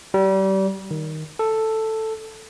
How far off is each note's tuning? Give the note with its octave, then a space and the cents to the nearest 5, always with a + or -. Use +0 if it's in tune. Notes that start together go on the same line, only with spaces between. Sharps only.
G3 -30
D#3 +0
A4 +5